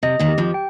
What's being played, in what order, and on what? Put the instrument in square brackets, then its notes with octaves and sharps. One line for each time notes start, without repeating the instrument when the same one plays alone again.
[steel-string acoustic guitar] C3 [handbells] D#5
[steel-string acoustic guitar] D#2 D#3
[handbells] G4
[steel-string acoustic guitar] F2 F3
[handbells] G5